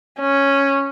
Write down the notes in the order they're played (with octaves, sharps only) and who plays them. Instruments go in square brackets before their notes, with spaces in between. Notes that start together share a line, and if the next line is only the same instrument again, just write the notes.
[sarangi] C#4